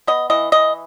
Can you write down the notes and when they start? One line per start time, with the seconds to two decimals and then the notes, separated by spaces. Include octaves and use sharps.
0.07 B3 D#5
0.30 E3 D#5
0.52 E3 D#5